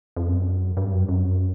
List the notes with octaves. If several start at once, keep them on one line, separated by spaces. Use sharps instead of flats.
F2
F#2
G2
F#2
F#2